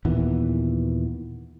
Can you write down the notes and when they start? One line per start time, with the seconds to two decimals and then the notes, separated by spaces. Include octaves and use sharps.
0.05 D#2 A#2 E3 B3